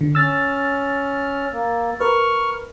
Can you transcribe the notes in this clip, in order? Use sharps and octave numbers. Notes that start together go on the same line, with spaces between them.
D3
C#4 E6 F6 A6
A#3
A#4 B4 C#6 F6